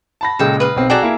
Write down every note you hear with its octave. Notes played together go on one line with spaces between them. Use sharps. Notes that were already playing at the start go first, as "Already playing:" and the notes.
A5 B5 A#6
A#2 C#3 G#3 A4 G5
B4 D#5 F5
B1 C4
F#4 G#4 A4 D5 G5 A#5
A#3 E4